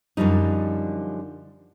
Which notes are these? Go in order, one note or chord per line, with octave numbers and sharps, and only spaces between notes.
F#2 D3 F3 G3 D#4